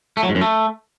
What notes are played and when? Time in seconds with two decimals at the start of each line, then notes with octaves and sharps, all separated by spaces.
0.17 A3
0.23 F#3
0.29 G#2
0.35 F#2
0.41 A3